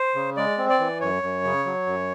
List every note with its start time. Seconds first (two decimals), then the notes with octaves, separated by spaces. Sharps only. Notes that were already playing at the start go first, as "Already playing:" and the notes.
Already playing: C5
0.15 C#3
0.37 G#3 D5
0.58 C4
0.69 D5
0.80 E3
1.01 F#2 C#5
1.23 F#2
1.44 C#3
1.66 F#3
1.87 F#2